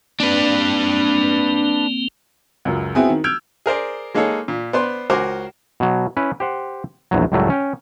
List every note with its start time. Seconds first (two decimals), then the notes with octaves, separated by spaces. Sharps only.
0.20 A#3 C4 D4 B4
2.65 C#2 F#2
2.95 B3 C4 E4 F#4 G#4
3.09 D#3
3.24 E6 F6 G6 G#6 D7 F7
3.66 G#4 A#4 C5 D5
4.15 G#3 A#3 D#4 G#4 A4 C#5
4.48 A#2
4.73 B3 B4 C5 D5 C6
5.10 C#2 F#4 A#4 C5 G#5 D6
5.80 B2 F#3
6.17 C#4 E4 B4
6.40 G4 C5 F#5
7.11 A#1 E2 F#3
7.32 C#2 F#2 A2 F#3 G3 A3
7.50 C#4 G5